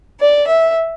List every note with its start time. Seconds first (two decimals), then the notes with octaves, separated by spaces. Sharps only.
0.20 D5
0.48 E5